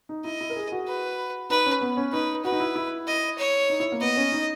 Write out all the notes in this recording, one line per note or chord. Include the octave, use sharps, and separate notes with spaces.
D#4
E4 D#5
E4
A#4
G#4
F#4
B4
D#4 B4
C#4
B3
C#4
D#4 B4
F#4 B4
D#4
E4
E4
D#5
C#5
D#4
E4
A#3
B3 D#5
C#4
D#4